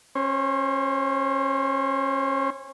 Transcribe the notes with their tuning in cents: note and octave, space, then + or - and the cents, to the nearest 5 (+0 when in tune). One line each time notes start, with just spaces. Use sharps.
C#4 -25 C5 +5